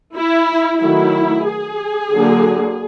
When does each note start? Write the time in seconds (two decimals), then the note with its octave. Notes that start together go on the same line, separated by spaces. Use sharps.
0.15 E4
0.80 D#3 F#3 A3 E4
1.47 G#4
2.13 D3 F#3 A#3 D4